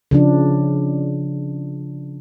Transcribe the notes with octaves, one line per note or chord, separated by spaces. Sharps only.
C#3 F3 D4